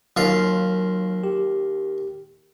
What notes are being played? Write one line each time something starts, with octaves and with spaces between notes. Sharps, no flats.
D#2 F#3 F4 C6
G4